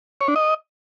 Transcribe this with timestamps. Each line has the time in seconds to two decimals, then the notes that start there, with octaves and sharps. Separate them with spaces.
0.21 C#5
0.28 D4
0.36 D#5